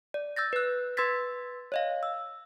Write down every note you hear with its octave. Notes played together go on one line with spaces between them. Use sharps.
D5
E6 G6 A6 A#6
B4 F#6
B4 C6 E6 G#6 A6 B6
C#5 D#5 F5
E6